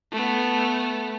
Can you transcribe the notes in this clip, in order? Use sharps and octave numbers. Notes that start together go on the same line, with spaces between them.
A3 B3